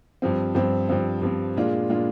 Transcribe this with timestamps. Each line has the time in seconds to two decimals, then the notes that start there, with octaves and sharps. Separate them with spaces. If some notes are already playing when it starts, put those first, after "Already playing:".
0.22 G2 F3 C4
0.55 G2 F3 C4
0.89 G2 F3 C4
1.22 G2 F3 C4
1.56 A#2 G#3 D4 F4
1.90 A#2 G#3 D4 F4